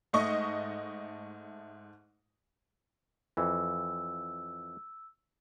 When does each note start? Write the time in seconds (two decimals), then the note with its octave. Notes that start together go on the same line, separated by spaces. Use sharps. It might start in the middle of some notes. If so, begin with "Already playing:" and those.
0.13 G#2 A3 D#5 C#6
3.37 F2 E3 E6